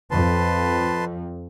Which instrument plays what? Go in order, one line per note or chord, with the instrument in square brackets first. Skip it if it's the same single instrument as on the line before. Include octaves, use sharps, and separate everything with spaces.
[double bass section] F2 [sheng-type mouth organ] B4 A5 C6